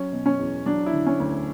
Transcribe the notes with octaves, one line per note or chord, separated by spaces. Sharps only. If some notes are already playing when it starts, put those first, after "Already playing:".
Already playing: F#3 C#4
B2
C#4
E2
F#3 D4
E4
D3
C#4
D2